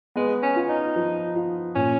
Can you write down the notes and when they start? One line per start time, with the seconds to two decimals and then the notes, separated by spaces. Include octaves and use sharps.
0.16 G#3 B3
0.43 C#4
0.56 F4
0.69 D#4
0.96 F3
1.36 F4
1.75 A#2 C#4